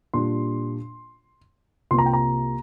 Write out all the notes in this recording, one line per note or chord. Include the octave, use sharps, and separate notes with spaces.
A#2 G3 D4 F4 C6
C2 C3 A#3 F4 C6
A#5
G5
A#5